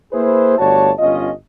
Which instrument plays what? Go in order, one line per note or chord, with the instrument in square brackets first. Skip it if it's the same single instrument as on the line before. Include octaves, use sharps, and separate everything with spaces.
[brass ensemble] A#3 E4 G#4 B4 C5
G1 A3 F#4 C#5 D5 A5
G1 C#4 F4 D#5